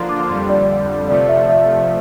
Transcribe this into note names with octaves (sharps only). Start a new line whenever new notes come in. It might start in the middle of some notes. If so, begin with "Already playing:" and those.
Already playing: D3 F3 A#3 D4 F4 C6
D6
F2 D3 G3 C6
D5
C3 F3 A3 D5
E5
E5